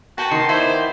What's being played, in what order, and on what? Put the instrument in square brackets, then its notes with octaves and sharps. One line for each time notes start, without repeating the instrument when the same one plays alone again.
[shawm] F#4 [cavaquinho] B4 G5 A5
[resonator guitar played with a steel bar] D#3 B3 [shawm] C6
[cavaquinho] E4 G4 D5 [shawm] C5